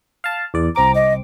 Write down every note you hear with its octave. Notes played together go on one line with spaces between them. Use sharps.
F5 A5
E2 D5
C2 C4 A#5 D6
D#5